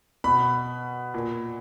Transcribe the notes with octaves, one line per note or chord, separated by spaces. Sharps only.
B2 B5
A#2